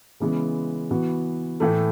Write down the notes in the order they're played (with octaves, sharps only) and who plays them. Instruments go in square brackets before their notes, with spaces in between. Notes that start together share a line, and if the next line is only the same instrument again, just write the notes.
[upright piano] C#3 E3 G#3 B3
E3 B3 F#4
A2 E3 A3